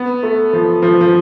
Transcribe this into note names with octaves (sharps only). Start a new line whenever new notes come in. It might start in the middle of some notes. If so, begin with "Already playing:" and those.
Already playing: B3
A3
F3
F3
F3